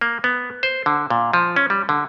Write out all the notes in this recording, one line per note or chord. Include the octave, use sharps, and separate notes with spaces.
A#3
B3
C5
D3
A#2
F3
C#4
G3
D3